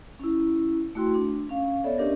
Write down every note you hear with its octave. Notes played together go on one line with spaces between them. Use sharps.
C#4 E4
A3 E4 F#4 G5 C6
D4
C#4 F5
B3 A4 C#5 D5 E5
C#4 D4 G4 A#4 D5 D#5